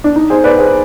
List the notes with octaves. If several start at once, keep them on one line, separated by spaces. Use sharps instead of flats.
D4
D#4
G#4 C5
B4 D5
G#4 C5